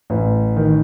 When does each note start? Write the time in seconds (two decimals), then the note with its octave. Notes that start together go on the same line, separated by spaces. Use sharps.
0.10 A1
0.56 D#3